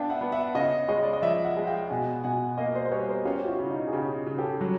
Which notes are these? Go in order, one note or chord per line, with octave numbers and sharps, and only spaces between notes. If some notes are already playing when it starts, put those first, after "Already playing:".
Already playing: B3 D4 F5 G5 A5
E5 F#5
B3
E5 F#5
C#3 D#5 F5
G#3 C#5 D#5
D5
D#5
F3 D5 E5
E5 F#5
G#3
F5 G5
B2 F#5 G#5
B2 F#5 G#5
A#3 D#5 F5
C5 D5
C5
G3 B4 C#5
A#4 C5
C#4 F4 G4
G4
E4 F#4
C#3
D#4 F4
G#4
C#3 F4 G4
C#3
G4 A4
F#3